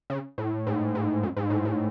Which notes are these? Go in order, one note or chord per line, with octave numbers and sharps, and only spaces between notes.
C#3
A2
G#2
G#2
F#2
G#2
A2
G#2